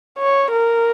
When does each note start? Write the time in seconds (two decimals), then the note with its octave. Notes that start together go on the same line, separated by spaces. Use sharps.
0.19 C#5
0.51 A#4